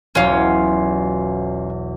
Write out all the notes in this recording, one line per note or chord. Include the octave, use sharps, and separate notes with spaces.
E1 B1 E2 C#4 F4